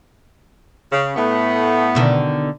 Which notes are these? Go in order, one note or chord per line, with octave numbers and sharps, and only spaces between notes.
C#3
A2 A3 B3
B2 D3 D#3